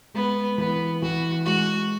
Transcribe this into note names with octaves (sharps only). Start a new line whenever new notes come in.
G#3 B3
E3 B3
E3 F#4
G#3 F#4